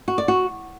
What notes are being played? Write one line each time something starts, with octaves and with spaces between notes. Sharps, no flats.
F#4
D5
F#4